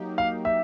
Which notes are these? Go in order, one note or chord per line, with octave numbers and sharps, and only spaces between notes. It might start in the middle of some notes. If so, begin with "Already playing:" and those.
Already playing: F#3 A#3 D#4 G4
F5
E5